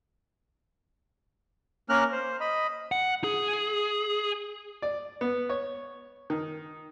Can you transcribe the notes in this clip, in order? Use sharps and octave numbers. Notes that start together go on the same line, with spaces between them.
A#3 C#4 A#4 F6 F#6
C5
D#5 B5
F#5
G#4
D5
B3
C#5
D#3